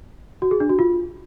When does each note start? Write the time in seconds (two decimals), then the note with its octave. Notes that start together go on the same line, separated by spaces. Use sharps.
0.42 F#4
0.51 G#4
0.60 D4
0.69 F#4
0.79 F4